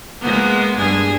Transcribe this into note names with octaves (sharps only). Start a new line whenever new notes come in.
G#3 A#3 B3
G2 G#4